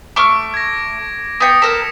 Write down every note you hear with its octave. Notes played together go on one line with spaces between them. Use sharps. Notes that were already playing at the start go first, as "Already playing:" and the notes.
A3 C#6 D6 F6 D7
G#6 A#6
B3 G5 D#6 A#6 C#7
A4 A#4 B6 E7